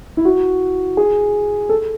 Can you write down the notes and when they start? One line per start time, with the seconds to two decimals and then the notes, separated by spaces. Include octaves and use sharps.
0.17 E4
0.25 F#4
0.97 G#4
1.69 A4